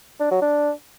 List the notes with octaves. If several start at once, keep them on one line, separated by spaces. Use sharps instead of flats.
D4
F#3
D4